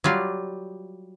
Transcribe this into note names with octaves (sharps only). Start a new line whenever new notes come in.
F#3 G3 F4 D5